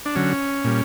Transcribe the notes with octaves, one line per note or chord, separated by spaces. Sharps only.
D4
D3 F#3 C#4
A#2 G3